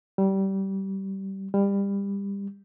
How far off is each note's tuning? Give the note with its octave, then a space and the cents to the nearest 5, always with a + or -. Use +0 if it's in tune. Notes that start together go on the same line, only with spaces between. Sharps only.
G3 -20
G3 +25